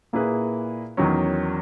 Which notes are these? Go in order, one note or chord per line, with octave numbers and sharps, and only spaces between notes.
A#2 A#3 E4 G#4 B4
E2 D#3 F#3 C#4